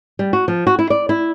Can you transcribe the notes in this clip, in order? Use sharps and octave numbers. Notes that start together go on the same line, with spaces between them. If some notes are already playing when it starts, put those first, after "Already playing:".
G3
F#4
F3
F#4
E4
D5
E4